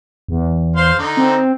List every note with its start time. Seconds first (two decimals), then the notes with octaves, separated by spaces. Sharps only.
0.28 E2
0.76 C5 F5 C6
0.98 D3 D#4
1.17 C4